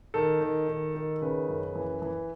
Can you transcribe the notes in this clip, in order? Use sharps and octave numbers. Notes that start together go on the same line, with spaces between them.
D#3 A4
D#3
D#3
D#3
C#3 B4
F#2
E3
E3